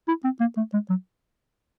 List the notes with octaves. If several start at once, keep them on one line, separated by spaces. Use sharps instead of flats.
E4
C4
A#3
A3
G#3
F#3